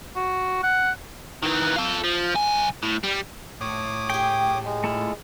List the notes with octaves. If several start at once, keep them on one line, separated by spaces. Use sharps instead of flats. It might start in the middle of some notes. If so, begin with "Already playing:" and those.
F#4
F#5
D#3 E3
F4 A4
F3
B1 G#5
A2
G3
A2 C#5 D6 D#6
G4 G#4 G5
G#3
A3 E4 F4